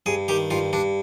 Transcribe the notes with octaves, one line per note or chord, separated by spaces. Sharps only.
G2 G#4
D#3 G4
G2 F4
G2 D4